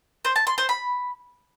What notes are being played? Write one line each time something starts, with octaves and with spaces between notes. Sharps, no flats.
C5
A5
C6
C5
B5